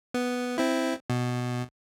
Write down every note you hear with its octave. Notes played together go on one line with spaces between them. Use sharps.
B3
C4 E4
B2